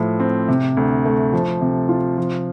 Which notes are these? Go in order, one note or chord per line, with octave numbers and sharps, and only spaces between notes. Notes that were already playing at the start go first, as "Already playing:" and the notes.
Already playing: A2 F3 E4
C4
C3
D2
A3
F3
C3
F4
F3